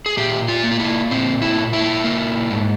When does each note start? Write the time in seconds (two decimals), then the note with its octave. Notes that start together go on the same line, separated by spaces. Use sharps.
0.06 G#4
0.17 A#2 G4
0.48 F4
0.64 A#3
0.71 F4
0.80 E4
1.11 A#2 C4
1.42 E4
1.57 A#2
1.73 E4
2.04 A#3
2.50 G#2